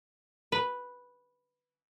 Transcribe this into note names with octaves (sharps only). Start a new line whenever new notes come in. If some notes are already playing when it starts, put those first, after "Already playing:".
B4